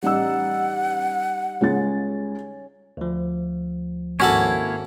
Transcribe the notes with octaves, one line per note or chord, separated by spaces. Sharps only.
A1 G3 D#4 D5 F#5 E6
C#2 G#3 C#4 A6
D2 F3
G#1 A#3 C#4 E4 F#4 A4 C#5